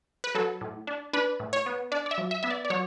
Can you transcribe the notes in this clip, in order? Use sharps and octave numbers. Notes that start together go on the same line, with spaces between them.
B4
F#3 A4
A2
D4
D4 B4
A2
C#5
B3
D4 D5
D5
E5
F#3
E5
B3 E5
D5
D5
F#3 C#5